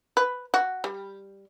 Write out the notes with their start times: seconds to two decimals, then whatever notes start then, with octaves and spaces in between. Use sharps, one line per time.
0.17 B4
0.54 F#4
0.84 G3